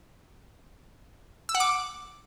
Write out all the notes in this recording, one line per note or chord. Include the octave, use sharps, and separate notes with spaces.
E6
F#5
D6